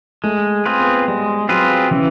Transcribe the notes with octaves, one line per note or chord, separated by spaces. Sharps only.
G#3 A3
C4 F4 G#4 B4
B3
G3 G#3
F#3 C4 F4 G#4 B4
C#3 E3